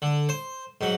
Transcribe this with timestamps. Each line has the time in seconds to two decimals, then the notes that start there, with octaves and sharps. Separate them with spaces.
0.02 D3
0.29 C5
0.81 G#2 F#3